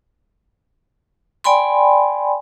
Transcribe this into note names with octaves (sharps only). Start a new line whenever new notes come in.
D5 G5 G#5 B5 C6